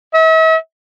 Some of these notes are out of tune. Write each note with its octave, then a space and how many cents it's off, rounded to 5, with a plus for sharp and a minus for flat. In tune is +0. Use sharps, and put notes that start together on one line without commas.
E5 -45